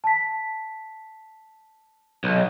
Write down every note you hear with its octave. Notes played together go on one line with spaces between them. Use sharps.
A5 B6
B1